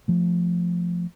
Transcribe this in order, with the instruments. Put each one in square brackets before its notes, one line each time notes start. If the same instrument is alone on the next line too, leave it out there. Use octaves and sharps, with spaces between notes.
[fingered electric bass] F3 A3